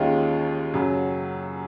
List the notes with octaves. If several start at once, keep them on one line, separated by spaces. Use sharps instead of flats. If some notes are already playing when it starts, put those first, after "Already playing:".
Already playing: D#2 D#3 G#3 C#4 F4
F#2 C#3 F#3